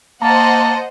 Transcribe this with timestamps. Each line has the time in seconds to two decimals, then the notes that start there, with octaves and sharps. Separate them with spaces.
0.22 A#3 C5 D#5 F5 F#5 A5 A#5